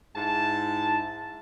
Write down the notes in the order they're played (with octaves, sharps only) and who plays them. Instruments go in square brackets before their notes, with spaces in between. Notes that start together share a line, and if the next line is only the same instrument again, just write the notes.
[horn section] G#2 E4 A5